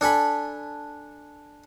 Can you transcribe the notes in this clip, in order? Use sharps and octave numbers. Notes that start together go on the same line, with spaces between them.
D4 A4 G#5 B5